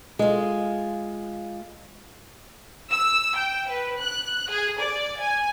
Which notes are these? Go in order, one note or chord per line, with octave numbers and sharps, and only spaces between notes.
G#3 F4
E6
G5
B4
F#6
G#4
D5
G#5